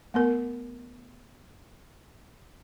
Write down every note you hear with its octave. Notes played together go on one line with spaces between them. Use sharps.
A3 B3 A#4